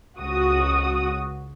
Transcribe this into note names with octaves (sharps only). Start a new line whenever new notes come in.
C#2 F#4 D#6